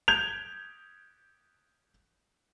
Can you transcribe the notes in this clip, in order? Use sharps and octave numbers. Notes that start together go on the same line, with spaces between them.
G6 G#6 F7